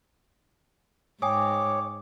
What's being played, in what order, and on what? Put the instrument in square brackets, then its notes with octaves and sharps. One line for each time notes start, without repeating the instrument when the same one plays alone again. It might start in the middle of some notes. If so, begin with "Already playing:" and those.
[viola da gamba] G#2 [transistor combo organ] C#5 [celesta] G5 G#5 D#6 [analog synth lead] D6